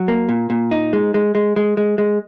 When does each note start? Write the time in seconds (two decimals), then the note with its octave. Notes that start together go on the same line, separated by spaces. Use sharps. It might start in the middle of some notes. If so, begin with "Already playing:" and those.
Already playing: F#3
0.08 A#3
0.29 A#2
0.50 A#2
0.71 D#4
0.93 G#3
1.14 G#3
1.35 G#3
1.56 G#3
1.77 G#3
1.98 G#3